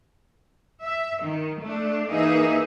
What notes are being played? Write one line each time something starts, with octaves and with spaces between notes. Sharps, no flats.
E5
D#3
A3 D4
E3 A#3 D#4 G#4 E5